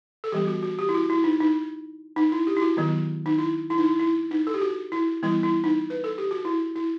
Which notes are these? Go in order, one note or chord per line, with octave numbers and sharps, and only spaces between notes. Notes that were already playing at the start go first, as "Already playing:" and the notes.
A4
E3 G3 B3 G4
F#4
F#4
G4
E4
F#4
E4
D#4
D#4
D#4
E4
G4
E4
F#4
D#3 F#3 B3
D#4
E4
E4
D#4
E4
E4
D#4
A4
G4
F#4
E4
E3 G3 B3 E4
E4
D#4
B4
A4
G4
F#4
E4
E4